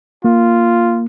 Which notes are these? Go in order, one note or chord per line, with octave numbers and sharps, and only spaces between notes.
A#3 F4